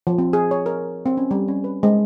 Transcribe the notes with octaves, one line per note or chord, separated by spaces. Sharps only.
F3
C4
G#4
C#5
A#4
C4
C#4
G3
C#4
B4
G#3